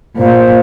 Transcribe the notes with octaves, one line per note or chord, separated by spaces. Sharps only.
A#2 C5